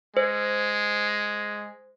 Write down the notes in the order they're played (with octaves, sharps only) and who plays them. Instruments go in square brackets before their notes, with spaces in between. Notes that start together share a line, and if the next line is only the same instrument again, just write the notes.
[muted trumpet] G#3 [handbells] C5